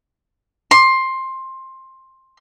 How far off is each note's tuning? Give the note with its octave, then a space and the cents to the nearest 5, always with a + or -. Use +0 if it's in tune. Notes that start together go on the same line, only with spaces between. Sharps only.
C6 +15